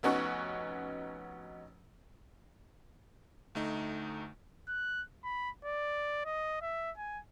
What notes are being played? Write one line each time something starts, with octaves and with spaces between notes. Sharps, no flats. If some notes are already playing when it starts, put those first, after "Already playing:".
F1 B3 C#4 D#4 F#4 C#6
D2 A3 D#4
F#6
B5
D5
D#5
E5
G#5